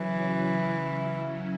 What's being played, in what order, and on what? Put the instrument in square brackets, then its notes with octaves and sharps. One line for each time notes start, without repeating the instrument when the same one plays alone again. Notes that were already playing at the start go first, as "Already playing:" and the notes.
Already playing: [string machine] C#3 F#3 C#4 E4 [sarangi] E3